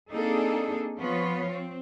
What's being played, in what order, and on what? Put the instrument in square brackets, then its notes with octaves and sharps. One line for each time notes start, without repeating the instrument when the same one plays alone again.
[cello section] A#3 C4 D4 D#4 G#4 A4
F3 B3 F4 C#5
C4